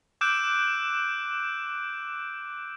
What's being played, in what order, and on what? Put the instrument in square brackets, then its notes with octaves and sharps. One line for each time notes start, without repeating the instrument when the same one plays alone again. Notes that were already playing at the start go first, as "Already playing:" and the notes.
[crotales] D6 E6 F#6 G6 D7 E7